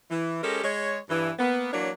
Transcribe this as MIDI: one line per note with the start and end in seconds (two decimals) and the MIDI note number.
0.10 0.41 52
0.42 0.62 56
0.42 0.62 61
0.42 0.62 67
0.42 0.62 69
0.42 0.62 70
0.63 0.97 56
0.63 0.97 73
1.09 1.31 43
1.09 1.31 52
1.39 1.71 58
1.39 1.71 59
1.72 1.90 52
1.72 1.90 54
1.72 1.90 58
1.72 1.90 62
1.72 1.90 73